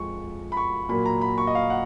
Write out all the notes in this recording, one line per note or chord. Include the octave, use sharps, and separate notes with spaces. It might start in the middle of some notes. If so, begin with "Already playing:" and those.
Already playing: F2 F3 G#3 C#6
B5
C#6
A#2 F#3 A#3 B5
A#5
B5
C#6
D#5
F5
F#5